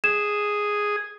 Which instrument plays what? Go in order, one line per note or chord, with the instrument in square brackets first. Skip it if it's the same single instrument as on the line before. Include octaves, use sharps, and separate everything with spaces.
[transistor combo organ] G#4 [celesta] E7